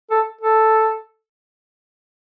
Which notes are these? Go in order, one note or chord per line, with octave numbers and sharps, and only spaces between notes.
A4
A4